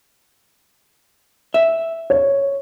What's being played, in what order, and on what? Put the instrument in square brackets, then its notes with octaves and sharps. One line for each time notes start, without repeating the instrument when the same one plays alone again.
[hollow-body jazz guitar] E5
[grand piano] C#5